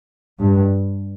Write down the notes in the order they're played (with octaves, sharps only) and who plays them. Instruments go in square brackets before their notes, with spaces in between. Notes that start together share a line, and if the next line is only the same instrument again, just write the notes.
[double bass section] G2